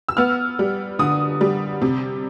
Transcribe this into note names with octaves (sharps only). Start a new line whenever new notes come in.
E6
B3 F6
G3
D3 D#6
G3
C3